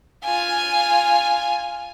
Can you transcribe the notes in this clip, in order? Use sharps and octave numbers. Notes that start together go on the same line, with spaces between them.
F4 G#5